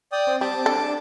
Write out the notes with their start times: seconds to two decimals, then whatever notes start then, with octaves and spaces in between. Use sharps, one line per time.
0.12 D5 G5 D#6
0.27 C4
0.41 G3 A5 D6
0.66 D4 A4